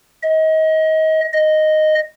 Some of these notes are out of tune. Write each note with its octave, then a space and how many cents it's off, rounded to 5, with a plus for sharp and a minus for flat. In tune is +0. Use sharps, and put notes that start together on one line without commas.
D#5 +30
D#5 -5